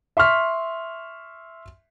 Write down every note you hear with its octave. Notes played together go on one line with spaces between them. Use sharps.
E5 C6 C#6 F6 B6